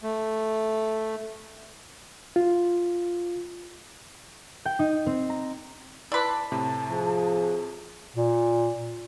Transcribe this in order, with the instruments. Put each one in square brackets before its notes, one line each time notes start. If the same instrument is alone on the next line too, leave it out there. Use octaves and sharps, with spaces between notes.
[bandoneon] A3
[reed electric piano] F4
[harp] G5
D#4
C4
A#5
[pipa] E4 B4 [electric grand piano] D5 C6 D6 [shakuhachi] A5
[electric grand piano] A2 C3
[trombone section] F3 G#4
[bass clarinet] A#2